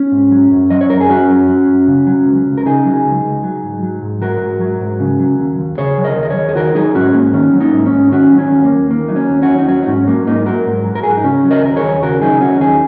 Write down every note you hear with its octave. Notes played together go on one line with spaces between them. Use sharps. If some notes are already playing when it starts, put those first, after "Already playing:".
Already playing: C#4
G#2
F#3
F#2
F#3 D#5
C#5
F#2 A#4
G#4
F#3 C#4 F#4
F#2
F#3
F#2
C#3
F#3
C#2
C#2
A#4
C#3 D#4 G#4
F#3
C#2
C#2
F#3
G#2
F#3
G#2
F#3 F#4 A#4
G#2
F#3
G#2
C#3
F#3
D#2
D#2
C#3 G#4 C#5
F#3
A#4 D#5
D#2
D#5
G#4 C#5
D#2
G#4
D#3 F#4 A#4
F#3 D#4 G#4
G#2 C#4 F#4
G#2 A#3
D#3 C#4
F#3
A#3 D#4
G#2
C#4
G#2
D#3 C#4 F#4
F#3
C#4
D#2
A#3
D#2
D#3 A#3
F#3 D#4
C#4
D#2
C#4 F#4
D#2
D#4
F#3 C#4 F#4
D#4
G#2 C#4
F#3 A#3
G#2 A#3 D#4
F#3 F#4 A#4
G#2
F#3
A#4
G#2 G#4
F#4
D#4
C#3 C#4
F#3
A#4 D#5
D#2 A#4
G#4 C#5
D#2
C#3 F#4 A#4
F#3 D#4 G#4
D#2 C#4 F#4
D#2 D#4 G#4